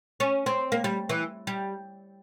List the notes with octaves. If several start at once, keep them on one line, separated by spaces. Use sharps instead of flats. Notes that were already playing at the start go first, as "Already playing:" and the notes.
C#4
C4
A#3
G3
E3
G3